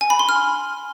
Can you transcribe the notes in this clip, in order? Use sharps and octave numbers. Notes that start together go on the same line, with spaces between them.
G#5
B5
C6
F6